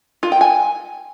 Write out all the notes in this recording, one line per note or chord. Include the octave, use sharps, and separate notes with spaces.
F4
G5
G#5